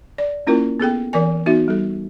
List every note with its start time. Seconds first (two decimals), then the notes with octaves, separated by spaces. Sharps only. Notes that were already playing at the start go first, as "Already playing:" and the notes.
0.18 D5
0.47 A#3 C#4 E4 F4 A#4
0.80 B3 G#4 A4 G5
1.13 E3 A#4 D5 G#5
1.46 B3 D#4 F#4 E5
1.68 G3 A4